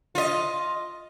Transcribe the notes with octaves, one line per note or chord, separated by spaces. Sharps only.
F4 D#5